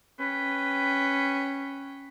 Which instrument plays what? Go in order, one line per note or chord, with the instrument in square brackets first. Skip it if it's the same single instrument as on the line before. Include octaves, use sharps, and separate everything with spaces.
[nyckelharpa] C#4 G5 [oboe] B4